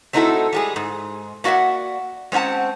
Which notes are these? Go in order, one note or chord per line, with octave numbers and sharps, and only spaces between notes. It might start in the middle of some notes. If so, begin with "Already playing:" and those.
A3 C4 D#4 E4 F#4 A4
G3 G#3 G#4
G#2
A#3 F#4 D5 E5 F#5
G#3 C4 C#4 F#5 A5